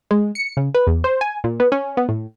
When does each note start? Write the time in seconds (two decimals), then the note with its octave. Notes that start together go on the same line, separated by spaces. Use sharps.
0.11 G#3
0.35 C#7
0.57 C#3
0.74 B4
0.87 E2
1.04 C5
1.21 G#5
1.44 A#2
1.60 B3
1.72 C#4
1.97 B3
2.09 A2